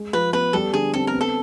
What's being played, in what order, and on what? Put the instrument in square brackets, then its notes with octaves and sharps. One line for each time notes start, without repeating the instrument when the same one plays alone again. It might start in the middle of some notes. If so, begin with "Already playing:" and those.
Already playing: [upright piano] G#3
[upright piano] F3 [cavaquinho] B4
[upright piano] B3 [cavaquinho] B4
[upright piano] G3 [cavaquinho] A4
[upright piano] D3 [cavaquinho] G#4
[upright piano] C4 [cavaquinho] A4
[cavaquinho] A#4
[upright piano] B3
[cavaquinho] A4